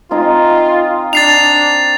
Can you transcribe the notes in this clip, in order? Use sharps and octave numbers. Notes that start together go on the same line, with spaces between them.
C4 D#4 F4 G#5
D4 A6 C7 F7